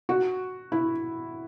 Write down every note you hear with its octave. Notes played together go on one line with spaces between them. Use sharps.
F#4
E4